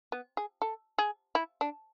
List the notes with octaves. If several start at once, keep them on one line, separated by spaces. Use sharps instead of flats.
B3
G#4
A4
G#4
E4
D4